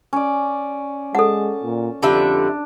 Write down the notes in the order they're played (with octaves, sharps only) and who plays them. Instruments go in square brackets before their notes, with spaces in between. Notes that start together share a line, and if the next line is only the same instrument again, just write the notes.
[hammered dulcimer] C#4 D5
[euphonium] G#3 [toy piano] A4 F#5 [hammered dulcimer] A5
[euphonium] A#2
[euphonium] F2 [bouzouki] D3 G3 E5 [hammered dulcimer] D4